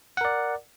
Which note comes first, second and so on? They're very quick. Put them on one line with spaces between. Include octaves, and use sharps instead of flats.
F#5 A#4 D5